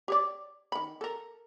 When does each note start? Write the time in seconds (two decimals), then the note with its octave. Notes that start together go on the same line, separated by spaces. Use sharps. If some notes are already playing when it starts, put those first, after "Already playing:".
0.08 G4 C#5 D5
0.72 D#3 B5
1.01 A4 A#4